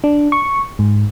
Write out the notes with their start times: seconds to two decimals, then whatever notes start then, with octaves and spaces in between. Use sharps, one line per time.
0.04 D4
0.32 C#6
0.79 G#2